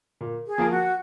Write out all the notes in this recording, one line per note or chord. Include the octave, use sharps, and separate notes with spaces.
A#2
G#4
F3 A#3 F4 A#4
F#4